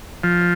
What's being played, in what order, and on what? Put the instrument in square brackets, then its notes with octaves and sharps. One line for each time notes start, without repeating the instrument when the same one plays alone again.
[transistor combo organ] F3